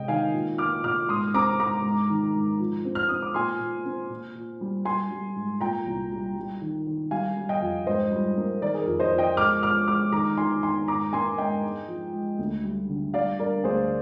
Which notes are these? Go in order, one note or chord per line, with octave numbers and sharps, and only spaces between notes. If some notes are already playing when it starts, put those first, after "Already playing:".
Already playing: C3 G#3 D#5 G5
D#3 F5 G#5
A#2
A#2 D6 F6
A#2 D6 F6
G#2 C6 D#6
C4 A#5 D6
G#2 A#5 D6
G#2
D#3
G#2
F3
C4
F6
C4 D#6
D6
A#2 G#5 C6
A#2
C4
A#2
A#2
G3
G3 G#5 C6
G3
G#2
A#2 G5 A#5
C2
G3
G3
D#3
D#3
G3 F5 G#5
G3
D#5 G5
F2
G#2 C5 D#5
G3
A#3
D#3 A#4 D5
G#4
A#4
F2
C5 D#5
F2
D#5 G5
G#3 D6 F6
G#3 D6 F6
G#3 D6 F6
D#3 A#5 D6
D#3 G#5 C6
D#3 G#5 C6
G#2 A#5 D6
A#3 G#5 C6
G#2 D#5 G5
G#3
F3
G#3
D2
G3
D3
G3 D5 F5
G3 A#4 D5
D2 G#4 C5